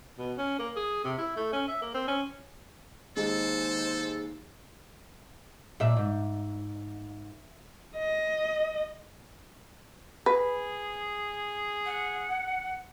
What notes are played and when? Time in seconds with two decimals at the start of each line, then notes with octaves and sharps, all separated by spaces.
0.18 B2
0.37 C#4
0.59 A#3
0.76 G#4
1.04 C3
1.18 E4
1.36 A3
1.53 C#4
1.68 E5
1.82 A#3
1.94 C4
2.08 C#4
3.17 D#2 G#3 A4 C5
5.80 A#2 E5
5.96 G#2
7.96 D#5
10.26 G#4 B4
11.86 F#5